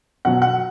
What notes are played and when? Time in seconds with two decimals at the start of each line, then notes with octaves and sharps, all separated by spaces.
0.25 B2 F#3 F#5
0.42 F#5